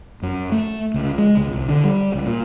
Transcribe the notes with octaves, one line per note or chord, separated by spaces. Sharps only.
F#2
A3
C#2
G#3
C#2
C2
D3
G3
C#2
A#2